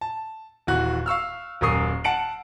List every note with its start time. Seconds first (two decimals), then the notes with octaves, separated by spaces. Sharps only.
0.01 A5
0.67 D#1 E3 F#4 F#6
1.06 F5 C#6 E6 F6
1.61 D#1 F#2 A#4 C#6 D#6 C7
2.04 F#5 A5 C#7 D7 F#7